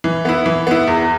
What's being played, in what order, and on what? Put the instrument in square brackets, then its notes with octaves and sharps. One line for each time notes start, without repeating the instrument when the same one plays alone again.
[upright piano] E3
B3 E4
E3
B3 E4
E2